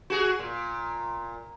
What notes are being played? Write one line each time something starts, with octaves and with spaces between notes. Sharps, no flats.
F#4 G#4
A#2